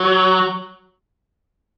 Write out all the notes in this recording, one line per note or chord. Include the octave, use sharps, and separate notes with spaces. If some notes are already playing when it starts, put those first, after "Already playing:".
Already playing: F#3